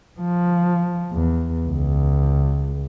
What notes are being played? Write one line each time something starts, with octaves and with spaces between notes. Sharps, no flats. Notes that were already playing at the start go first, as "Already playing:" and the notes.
F3
E2
C#2